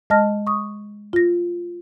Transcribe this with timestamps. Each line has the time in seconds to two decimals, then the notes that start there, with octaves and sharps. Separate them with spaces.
0.10 G#3 D#5 A5 F6 A#6
0.47 C#6 D#6
1.13 F4 A#6